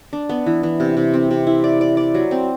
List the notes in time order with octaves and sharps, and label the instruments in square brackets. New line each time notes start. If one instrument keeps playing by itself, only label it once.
[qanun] D4
B3
E3
E3
C3
C3
C4
C3
E4
D5
D5
D5
F#3
C4